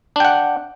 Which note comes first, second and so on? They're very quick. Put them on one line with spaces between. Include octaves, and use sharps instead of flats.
D4 G5 F#5